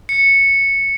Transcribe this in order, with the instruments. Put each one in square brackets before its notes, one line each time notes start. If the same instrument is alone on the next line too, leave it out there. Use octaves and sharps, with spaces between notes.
[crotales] C#7